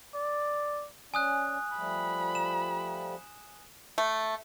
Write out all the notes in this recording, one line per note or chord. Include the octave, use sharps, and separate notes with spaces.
D5
C#4 D5 G#5 D#6 F#6
F3 G3 A3 B5
E7
A3